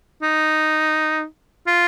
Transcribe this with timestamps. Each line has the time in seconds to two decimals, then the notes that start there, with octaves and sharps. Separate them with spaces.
0.23 D#4
1.67 F4